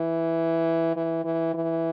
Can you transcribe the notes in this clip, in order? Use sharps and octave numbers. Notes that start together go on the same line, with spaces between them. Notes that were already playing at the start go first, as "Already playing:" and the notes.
Already playing: E3
E3
E3
E3